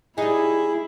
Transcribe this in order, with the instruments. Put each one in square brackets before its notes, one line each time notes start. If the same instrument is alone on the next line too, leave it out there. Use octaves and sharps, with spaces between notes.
[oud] G3 D#4 [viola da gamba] E4 [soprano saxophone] G#4